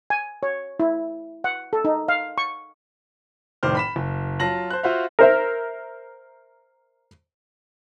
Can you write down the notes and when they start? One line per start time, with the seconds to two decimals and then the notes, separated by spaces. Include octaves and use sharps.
0.10 G#5
0.43 C#5
0.80 E4
1.44 F#5
1.73 A4
1.85 D#4
2.08 F5
2.38 C#6
3.63 F1 A2 D#3 C5 D6 F6
3.75 B5 B6 E7
3.96 F#1
4.40 F#3 F4 A5 A#6 F#7
4.70 C5 A5 F#6
4.83 F4 F#4 C5 E5 F5
5.19 A#4 C5 E5